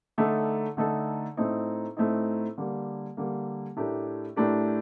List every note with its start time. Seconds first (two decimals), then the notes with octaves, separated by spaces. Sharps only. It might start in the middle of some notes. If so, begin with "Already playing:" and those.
0.18 D3 A3 D#4 A4
0.77 D3 A3 D#4 A4
1.37 A2 A3 C4 D#4
1.97 A2 A3 C4 D#4
2.57 D3 G3 A#3
3.17 D3 G3 A#3
3.77 A2 A3 D4 G4 A#4
4.36 A2 A3 D4 G4 A#4